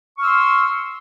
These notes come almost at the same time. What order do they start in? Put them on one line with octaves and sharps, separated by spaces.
C#6 F6 E6 C6